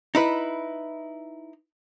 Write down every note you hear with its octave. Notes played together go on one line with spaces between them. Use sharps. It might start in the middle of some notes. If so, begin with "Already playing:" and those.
D#4 E4 B4